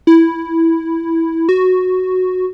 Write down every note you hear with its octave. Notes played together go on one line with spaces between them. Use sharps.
E4
F#4